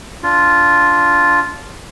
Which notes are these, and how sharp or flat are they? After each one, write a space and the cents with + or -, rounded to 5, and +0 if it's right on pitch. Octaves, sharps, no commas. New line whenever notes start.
D4 -15 F4 +0